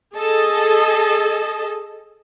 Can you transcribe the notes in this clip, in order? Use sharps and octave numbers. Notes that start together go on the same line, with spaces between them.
G#4 A4 D#5 A5